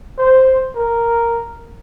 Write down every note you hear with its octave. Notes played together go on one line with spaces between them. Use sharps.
C5
A#4